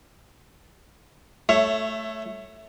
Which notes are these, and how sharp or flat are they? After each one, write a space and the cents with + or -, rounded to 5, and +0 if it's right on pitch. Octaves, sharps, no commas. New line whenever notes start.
A3 -5 C#5 +0 E5 +20